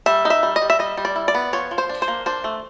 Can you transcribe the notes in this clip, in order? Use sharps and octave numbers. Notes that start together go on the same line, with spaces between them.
G3 E5
D#4
E5
G3
D#5
G3
E5
G3 D#5
G3
D5
E4
D5
B3
F3 C#5
F3
C5
D4
C5
A#3
D4 C5
A3